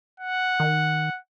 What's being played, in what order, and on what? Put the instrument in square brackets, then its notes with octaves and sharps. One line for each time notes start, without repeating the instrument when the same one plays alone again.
[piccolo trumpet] F#5
[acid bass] D#3